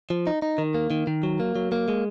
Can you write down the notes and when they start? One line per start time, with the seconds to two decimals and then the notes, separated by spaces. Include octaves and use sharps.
0.10 F3
0.27 D#4
0.42 D#4
0.58 D#3
0.75 A#3
0.91 D#3
1.07 D#3
1.23 F#3
1.40 A#3
1.56 F#3
1.72 A#3
1.88 G#3